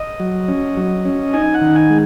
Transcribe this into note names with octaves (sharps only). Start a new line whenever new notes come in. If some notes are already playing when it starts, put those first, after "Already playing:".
Already playing: D#5
F#3
C#4
F#3
C#4
D#4 G#5
F#5
D#3
G#5
G#3